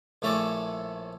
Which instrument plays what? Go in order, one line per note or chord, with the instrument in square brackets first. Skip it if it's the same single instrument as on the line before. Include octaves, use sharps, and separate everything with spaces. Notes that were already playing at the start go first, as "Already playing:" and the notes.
[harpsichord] A#1 A2 A3 C#4 A5 D6